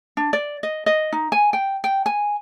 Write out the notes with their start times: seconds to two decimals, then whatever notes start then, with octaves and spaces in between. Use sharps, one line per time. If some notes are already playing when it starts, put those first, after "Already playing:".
0.17 D4
0.33 D5
0.63 D#5
0.86 D#5
1.12 D#4
1.32 G#5
1.53 G5
1.84 G5
2.06 G#5